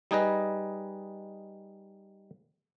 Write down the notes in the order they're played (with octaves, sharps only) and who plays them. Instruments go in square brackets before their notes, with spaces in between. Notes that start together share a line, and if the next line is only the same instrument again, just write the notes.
[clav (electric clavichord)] G3 D#4 G#4 B4 D#5